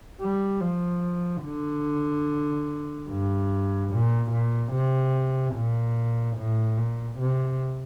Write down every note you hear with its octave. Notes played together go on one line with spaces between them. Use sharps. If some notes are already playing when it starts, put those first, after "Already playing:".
G3
F3
D3
G2
A#2
A#2
C3
A#2
A2
A#2
C3